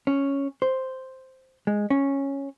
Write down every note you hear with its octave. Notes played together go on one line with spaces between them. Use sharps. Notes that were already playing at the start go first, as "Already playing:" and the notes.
C#4
C5
G#3
C#4